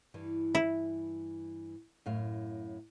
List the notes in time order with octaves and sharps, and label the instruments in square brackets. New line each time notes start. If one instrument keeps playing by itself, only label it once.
[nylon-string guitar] G2 E3 G3
[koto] E4
[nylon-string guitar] F#2 A2 F5